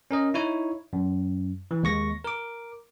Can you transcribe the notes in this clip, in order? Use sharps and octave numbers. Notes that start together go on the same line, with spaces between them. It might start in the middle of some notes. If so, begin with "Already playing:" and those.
C#4 A#4 D#5
D#4 E4 C#5
F#2
E3
D#2 G#3 C#6 A#6
A#4 D6